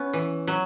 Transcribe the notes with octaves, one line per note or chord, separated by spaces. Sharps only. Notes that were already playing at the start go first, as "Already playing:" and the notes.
Already playing: B3 C#4
E3
F#3